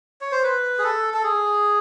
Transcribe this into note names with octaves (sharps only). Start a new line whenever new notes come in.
C#5
C5
B4
G#4
A4
A4
G#4